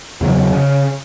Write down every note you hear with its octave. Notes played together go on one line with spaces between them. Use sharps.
E2 C#3 F#3
C#3